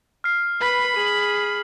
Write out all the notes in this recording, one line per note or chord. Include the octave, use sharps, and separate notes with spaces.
F6 C7
B4 B5
G#4 D#7 F#7